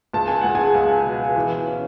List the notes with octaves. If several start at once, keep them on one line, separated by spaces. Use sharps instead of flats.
C#2 A5
G#5
C#2 F#5
G#4 G#5
C#2
B2
E3
C#4